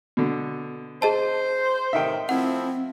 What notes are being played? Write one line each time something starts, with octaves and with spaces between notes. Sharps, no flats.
B2 D3
G#4 C5 D#5 A5
A2 C3 D#3 E5 G5
F3 A3 C4 E4 F#5